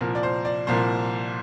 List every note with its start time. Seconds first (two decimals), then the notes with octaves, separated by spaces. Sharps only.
0.01 C2 A#2 F3 A#4
0.15 D5
0.23 C5
0.45 D5
0.67 C2 A#2 F3 C5